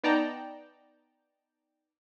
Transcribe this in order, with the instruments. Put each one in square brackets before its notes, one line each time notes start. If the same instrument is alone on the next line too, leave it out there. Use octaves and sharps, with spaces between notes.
[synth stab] B3 D#4 D5 G5 A5 A#5